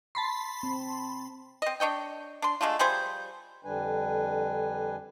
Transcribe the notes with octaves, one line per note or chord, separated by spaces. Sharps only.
A5 B5 C6
C4
C4 D#5
D4 C#5 D#5 G5
D4 C6
G#3 A3 D4 F4
F3 G3 G#4 C5
F2 D3 G3 D4 B4 G#5